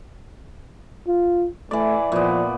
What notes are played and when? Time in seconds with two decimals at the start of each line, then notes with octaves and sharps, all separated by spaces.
1.07 F4
1.71 E3 A3 D5
2.12 A#2 F3 B3